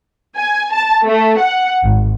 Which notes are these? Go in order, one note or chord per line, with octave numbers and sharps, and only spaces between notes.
G#5
A5
A3
F#5
G#1